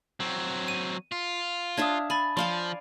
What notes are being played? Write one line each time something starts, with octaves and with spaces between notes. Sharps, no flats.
F#3 C4
D#7
F4
D4 E5 F5 D#6 G#6
G#5 A5 B5 A6
F3 D5 F5 G#5 C6